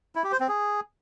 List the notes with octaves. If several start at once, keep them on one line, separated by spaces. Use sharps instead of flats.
E4
G4
C5
C4
G#4